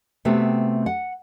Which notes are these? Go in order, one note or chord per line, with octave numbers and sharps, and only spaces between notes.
C3 A3 B3 C4 F#4
F#5